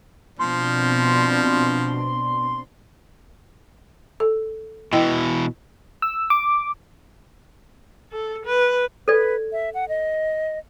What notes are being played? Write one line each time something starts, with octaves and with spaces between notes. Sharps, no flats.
B2 F3 C4 D4 C6
A4
B2 E3 E4 D#5 G5
E6
D6
A4
B4
A4 B4 D5
E5
F#5
D#5